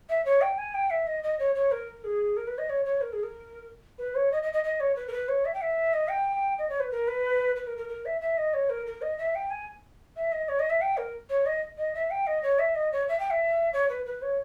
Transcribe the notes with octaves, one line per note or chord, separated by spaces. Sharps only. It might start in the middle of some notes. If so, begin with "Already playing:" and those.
E5
C#5
G5
G#5
G5
E5
D#5
D#5
C#5
C#5
A#4
G#4
A#4
B4
D#5
C#5
C#5
A#4
G#4
A#4
B4
C#5
D#5
D#5
D#5
D#5
C#5
B4
A#4
B4
C#5
E5
G5
E5
D#5
G5
D#5
C#5
B4
A#4
B4
B4
A#4
A#4
A#4
E5
E5
D#5
C#5
A#4
A#4
D#5
E5
G5
G#5
E5
D#5
C#5
D#5
E5
G5
A#4
C#5
D#5
D#5
E5
G5
D#5
C#5
E5
D#5
C#5
E5
G5
E5
C#5
B4
B4
C#5